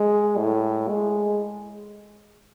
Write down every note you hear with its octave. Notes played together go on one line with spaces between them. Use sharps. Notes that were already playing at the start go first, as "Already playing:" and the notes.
Already playing: G#3
A2
G#3